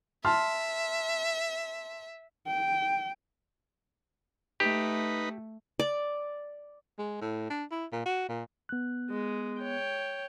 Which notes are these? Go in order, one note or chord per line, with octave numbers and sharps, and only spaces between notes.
E5 A5 C6 F6
G5
A3 D#4 G4 B4
D5
G#3
A2
D4
E4
A#2
F#4
A#2
B3 F#6
G#3
C#5 G5